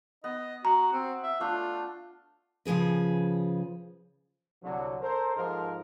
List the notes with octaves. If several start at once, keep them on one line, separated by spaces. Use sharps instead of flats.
B3 D#5
F#4 A#5
C4 F#5
E5
A3 D4 F4 A5
C#3 F3 F#3 G#4 B4
C2 D3 F#3
A4 A#4 C5
G#2 F3 G#3 A4 A#4